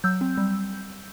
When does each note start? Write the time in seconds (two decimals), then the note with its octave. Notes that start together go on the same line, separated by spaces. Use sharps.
0.04 F#3 E6 G6
0.21 C4
0.37 G3